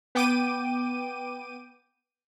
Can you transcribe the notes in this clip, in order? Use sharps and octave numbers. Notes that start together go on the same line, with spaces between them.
B3 G5 D6 D#7